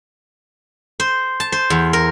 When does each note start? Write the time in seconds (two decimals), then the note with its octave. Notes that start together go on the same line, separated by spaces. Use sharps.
1.00 C5
1.40 A5
1.52 C5
1.70 E2
1.93 A#4